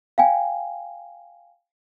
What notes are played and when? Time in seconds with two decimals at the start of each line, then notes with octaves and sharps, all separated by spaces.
0.18 F5 G5 G#5